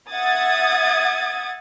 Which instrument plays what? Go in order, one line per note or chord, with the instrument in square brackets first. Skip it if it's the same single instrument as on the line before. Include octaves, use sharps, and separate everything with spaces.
[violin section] E5 F#5 D#6 G#6 A6